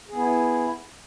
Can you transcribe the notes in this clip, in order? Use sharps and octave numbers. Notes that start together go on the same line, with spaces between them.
B3 E4 G#4